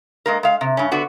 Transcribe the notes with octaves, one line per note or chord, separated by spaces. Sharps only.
G#3 A#3 A#4
G#3 F5
C3
G2 C#4
D3 B3 F#4